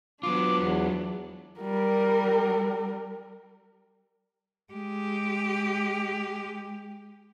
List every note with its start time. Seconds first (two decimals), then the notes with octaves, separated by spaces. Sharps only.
0.23 F#3 B3 D4 F4 D6
0.58 E2
1.60 G3 A#4
4.73 G#3 G4